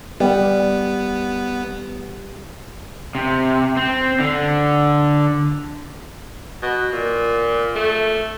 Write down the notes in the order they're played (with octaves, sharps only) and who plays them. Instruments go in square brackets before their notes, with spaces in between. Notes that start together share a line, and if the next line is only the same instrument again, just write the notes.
[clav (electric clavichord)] G3 [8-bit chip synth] B3
[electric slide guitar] C3
C4
D3
[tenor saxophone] B2
A#2
A3